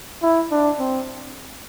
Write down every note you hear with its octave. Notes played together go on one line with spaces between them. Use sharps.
E4
D4
C4